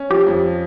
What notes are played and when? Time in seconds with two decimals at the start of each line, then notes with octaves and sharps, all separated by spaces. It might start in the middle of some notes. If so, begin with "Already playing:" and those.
Already playing: C#4
0.10 F3 G4
0.27 F2